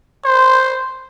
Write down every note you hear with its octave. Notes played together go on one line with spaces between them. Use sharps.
C5